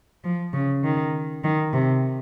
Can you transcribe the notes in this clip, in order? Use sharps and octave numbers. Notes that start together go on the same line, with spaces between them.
F3
C#3
D#3
D#3
C3